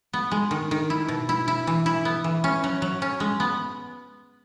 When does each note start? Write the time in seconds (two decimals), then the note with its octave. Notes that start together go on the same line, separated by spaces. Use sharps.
0.13 B3
0.32 G#3
0.51 D#3
0.71 D#3
0.90 E4
1.08 B2
1.29 E4
1.48 E4
1.67 E3
1.86 E4
2.05 B3
2.24 E3
2.44 C#4
2.64 F#3
2.82 F#3
3.02 C#4
3.20 G#3
3.40 B3